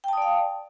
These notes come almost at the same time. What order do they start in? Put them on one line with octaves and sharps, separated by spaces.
G5 A5 D#6 D5 F5